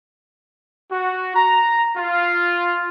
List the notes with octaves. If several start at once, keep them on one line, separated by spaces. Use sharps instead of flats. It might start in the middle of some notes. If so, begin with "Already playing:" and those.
F#4
A#5
F4